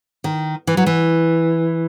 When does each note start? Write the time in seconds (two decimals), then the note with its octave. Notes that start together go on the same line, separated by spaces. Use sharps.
0.24 D#3
0.67 E3
0.77 F#3
0.86 E3